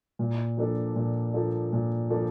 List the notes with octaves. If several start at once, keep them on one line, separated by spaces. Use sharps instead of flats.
A#2
F3 A#3 D4 A4
A#2
F3 A#3 D4 A4
A#2
F3 A#3 D4 A4